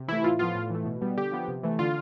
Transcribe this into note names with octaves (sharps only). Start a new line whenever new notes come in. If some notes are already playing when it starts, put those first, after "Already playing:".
Already playing: C3
E3 A3 E4
A2 F4
F3 B3 F4
A2
E3 A3
B2
G3 B3
D3 G4
F3 B3
C3
E3 A3
D3 F4